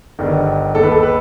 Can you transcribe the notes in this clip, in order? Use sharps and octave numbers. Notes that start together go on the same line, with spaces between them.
G1 G2 D#3
D#2 D#3 A4
B4
A4
B4